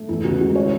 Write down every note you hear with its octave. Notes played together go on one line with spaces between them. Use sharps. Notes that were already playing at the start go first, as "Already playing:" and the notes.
Already playing: A3
E2 E4
C#3 F#4
G#3 F#4
E3 C#5